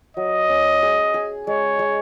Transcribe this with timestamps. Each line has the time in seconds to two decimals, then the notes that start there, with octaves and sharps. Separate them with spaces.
0.17 F#3 D#5
0.49 C#4
0.83 G#4
1.14 G#4
1.47 G#3 C#5
1.79 G#3